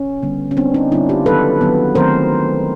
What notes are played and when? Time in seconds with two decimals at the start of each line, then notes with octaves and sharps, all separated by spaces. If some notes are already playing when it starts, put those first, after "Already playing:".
Already playing: C#4
0.23 D3 G3 B3
0.51 C#4
0.57 D3 G3 B3 C4 D4
0.74 C#4 D#4
0.92 D3 G3 B3 D4 E4
1.09 F4 G4
1.26 D#3 F#3 B3 A4 B4
1.61 D#3 F#3 B3
1.95 D#3 F#3 A3 C4 A#4 C5